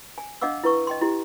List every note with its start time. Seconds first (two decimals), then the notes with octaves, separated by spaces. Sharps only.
0.18 G#5
0.42 D4 D#5 F5 F#5 D6 E6
0.64 E4 B4 C#6
0.87 D#5 G5 C6
1.01 E4 G4